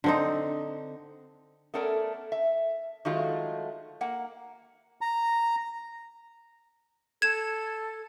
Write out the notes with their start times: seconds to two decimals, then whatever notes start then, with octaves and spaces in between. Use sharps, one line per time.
0.04 D3 C4 D#4
1.74 A3 B3 C#4 A4 A#4 D5
2.32 E5
3.05 D#3 F#3 G#3 A3 F4 F#4
4.01 A#3 F#5
5.01 A#5
7.22 A4 G#6 E7